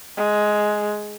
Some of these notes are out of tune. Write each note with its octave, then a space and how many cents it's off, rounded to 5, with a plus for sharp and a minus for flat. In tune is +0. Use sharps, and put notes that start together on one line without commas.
G#3 +10